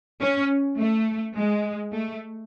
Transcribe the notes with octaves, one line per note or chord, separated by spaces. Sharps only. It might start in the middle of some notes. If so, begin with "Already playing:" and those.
C#4
A3
G#3
A3